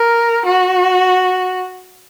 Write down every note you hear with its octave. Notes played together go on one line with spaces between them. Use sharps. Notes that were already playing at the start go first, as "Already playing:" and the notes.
Already playing: A#4
F#4